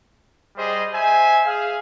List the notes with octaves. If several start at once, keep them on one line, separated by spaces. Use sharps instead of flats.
G3 G#4 C5 D#5
C5 E5 G#5
G#4 F5